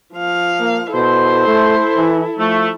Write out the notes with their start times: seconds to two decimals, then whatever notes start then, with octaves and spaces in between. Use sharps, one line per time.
0.14 F3 F5
0.60 A#3
0.94 B2 E4 A4 C5
1.47 A3
1.96 E3
2.38 F3 A3